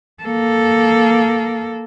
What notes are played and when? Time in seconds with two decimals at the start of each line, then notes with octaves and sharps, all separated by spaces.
0.23 A#3 A4